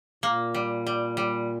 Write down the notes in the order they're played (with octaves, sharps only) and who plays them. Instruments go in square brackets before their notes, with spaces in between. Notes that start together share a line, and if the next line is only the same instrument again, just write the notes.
[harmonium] A#2 [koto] A#3
[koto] G3
G3
G3